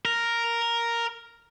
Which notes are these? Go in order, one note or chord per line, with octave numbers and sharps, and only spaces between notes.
A#4